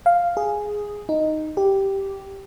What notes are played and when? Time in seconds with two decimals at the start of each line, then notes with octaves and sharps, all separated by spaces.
0.06 F5
0.37 G#4
1.09 D#4
1.57 G4